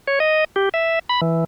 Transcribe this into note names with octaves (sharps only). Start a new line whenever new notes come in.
C#5
D#5
G4
E5
B5
E3